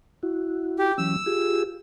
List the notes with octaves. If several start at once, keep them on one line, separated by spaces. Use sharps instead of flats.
E4 F#4
G4
E3 F#3 C#4 E6
F4 G4 G#4